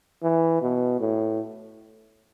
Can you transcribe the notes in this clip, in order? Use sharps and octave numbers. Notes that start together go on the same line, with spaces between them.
E3
B2
A2